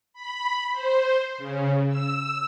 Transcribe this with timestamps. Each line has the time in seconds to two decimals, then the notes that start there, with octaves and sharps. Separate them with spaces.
0.14 B5
0.72 C5
1.38 C#3
1.89 E6